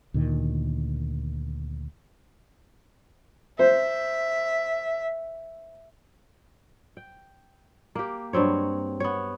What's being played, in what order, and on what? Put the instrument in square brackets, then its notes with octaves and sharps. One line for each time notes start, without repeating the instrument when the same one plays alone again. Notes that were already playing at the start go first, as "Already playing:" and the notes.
[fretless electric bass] D2 A#2 D#3
[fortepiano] C5 [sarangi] E5
[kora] G5
A#3 G4
G2 F#3 C4 C#5
B3 C#5